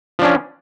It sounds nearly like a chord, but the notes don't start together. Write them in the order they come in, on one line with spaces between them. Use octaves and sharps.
F3 D4 C#4